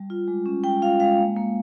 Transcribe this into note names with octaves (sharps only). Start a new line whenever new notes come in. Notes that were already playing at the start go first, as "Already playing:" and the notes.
Already playing: G3
F4
G#3
C#4
G#3 G5
F4 F5
G#3 F5
A#3
A#3